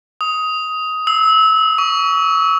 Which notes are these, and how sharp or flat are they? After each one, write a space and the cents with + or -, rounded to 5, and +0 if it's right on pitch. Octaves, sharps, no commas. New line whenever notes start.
D#6 +15
E6 -25
C#6 +35